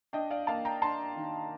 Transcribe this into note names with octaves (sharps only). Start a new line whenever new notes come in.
D4 D#5 G5
D5 F5
A#3 F5 A5
G5 A#5
D4 A5 C6
D#3